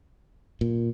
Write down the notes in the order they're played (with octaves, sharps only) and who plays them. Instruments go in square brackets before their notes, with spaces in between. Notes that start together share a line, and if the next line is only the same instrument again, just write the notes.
[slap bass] A#2